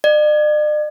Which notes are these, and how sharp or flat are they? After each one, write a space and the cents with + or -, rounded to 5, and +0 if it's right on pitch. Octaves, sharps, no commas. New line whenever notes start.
D5 +45